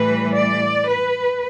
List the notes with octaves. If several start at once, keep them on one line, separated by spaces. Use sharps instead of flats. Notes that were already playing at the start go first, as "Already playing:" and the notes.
Already playing: A2 E3 G3 B4
D5
B4